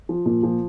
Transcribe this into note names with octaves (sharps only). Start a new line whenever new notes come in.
F3
A#2
F3